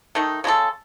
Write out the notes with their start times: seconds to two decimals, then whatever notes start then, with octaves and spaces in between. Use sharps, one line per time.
0.15 D#3 A3 D#4
0.44 C#3 G#3 D#4 A4